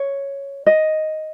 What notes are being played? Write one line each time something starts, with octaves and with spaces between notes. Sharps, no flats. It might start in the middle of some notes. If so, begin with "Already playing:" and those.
Already playing: C#5
D#5